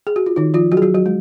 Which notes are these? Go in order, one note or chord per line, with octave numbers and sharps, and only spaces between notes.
G#4
F#4
F4
D#3 D#4
F3 F4
F#3 F#4
G#4
F#3 F#4
F#3 F#4
G#3